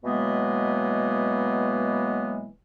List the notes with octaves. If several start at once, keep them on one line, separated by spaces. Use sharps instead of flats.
B2 E3 F#3 G#3 A#3 B3